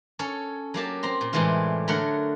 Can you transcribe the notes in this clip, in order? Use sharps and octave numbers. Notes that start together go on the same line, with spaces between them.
C#4 A4 C#5
F#3 A#3 G4 A5
C4 A#5 C6
A#2
A2 C3 E3 G3 G#3 F4
D3 F#3 A3 A#4 C#5 F#5